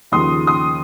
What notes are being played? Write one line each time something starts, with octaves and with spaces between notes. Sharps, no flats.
D#2 C#3 F3 C6 D#6
C6 D#6